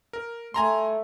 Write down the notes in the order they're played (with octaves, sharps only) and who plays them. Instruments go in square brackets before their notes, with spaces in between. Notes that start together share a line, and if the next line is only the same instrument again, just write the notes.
[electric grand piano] A#4
[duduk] A3 [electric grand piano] G#5 A#5 C6